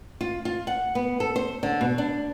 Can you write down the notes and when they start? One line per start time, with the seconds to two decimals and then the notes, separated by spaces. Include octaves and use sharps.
0.21 F4
0.45 F4
0.67 F#5
0.95 B3
1.20 A4
1.36 C5
1.63 D3
1.81 B2
1.98 D4